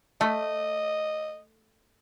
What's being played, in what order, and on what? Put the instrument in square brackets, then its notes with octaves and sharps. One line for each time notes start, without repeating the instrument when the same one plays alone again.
[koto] A3 [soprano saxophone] D#5